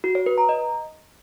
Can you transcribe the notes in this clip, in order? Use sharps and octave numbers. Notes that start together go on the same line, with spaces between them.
F#4
C#5
B4
A#5
D#5